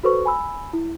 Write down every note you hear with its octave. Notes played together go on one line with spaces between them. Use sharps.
F#4 A4 B4 C5 C#6
G#5 B5 E6
E4